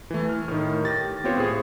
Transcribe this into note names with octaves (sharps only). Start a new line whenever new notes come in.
E3 A3
F6
A2 D#3
G4 A6 A#6
B3 C4 F4 G4 C5 C#5
A2 G#4